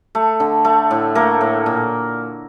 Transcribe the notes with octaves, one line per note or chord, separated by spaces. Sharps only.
A3
D3
A3
A2
A3 A#3 A#4
A2
A#2